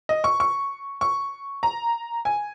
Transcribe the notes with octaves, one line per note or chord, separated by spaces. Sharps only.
D#5
C#6
C#6
C#6
A#5
G#5